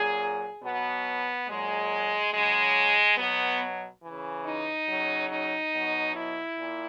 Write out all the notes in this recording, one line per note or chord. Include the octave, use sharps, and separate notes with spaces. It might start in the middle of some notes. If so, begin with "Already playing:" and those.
Already playing: A#2 F#3 G#4
B2 F#3 B3
A#2 F#3 G#3
C#3 F#3 G#3
B2 F#3 B3
C#3 E3
D#4
C#3 F#3
D#4
B2 F#3
E4
A#2